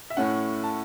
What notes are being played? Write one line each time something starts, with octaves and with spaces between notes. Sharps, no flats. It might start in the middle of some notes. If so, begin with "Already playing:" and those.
E5
A2 A3 C#4 F#5
A5